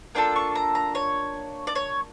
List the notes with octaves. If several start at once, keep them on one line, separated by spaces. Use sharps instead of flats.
A#3 D4 F4 A4 G5
C#6
A#5
A#5
C#5
D5
C#5